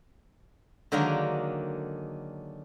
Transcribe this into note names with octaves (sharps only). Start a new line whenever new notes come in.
D3 D#3 F#3 G#3 A#3 D4